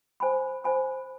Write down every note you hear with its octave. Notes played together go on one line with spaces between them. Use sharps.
C5 G#5 B5
C5 G#5 B5